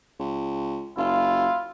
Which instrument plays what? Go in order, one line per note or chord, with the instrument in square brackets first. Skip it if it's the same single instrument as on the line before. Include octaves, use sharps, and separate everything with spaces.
[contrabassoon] C#2
[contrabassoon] F#1 [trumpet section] E4 F4